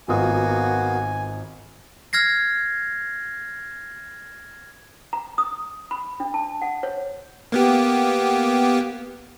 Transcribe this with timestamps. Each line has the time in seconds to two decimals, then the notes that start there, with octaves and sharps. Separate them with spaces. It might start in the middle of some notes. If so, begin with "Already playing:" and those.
0.08 G#1 A#3 B3 F4 F#4 G#5 D#6
2.13 F6 G#6 A#6 C7
5.13 A#5
5.38 D#6
5.91 B5
6.20 D4
6.34 A5
6.62 F#5
6.83 C#5
7.52 A#3 B3 G4